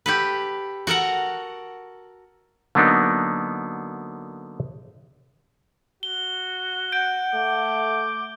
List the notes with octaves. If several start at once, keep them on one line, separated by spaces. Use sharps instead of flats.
G4 A4 B4
F#4 A4 A#4 F#5
D3 F#3 A#3 B3 D4 D#4
F#4 G7
F#5 G6 D7
A3 D6